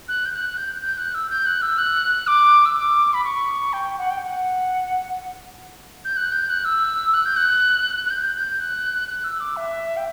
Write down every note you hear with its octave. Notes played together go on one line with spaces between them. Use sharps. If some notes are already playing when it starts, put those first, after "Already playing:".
F#6
G6
F#6
G6
G6
F#6
E6
G6
F#6
E6
F#6
D6
E6
D6
B5
C#6
G5
F#5
G5
F#5
G6
F#6
G6
F#6
E6
F#6
G6
F#6
F#6
G6
G6
F#6
F#6
E6
D6
E5
G5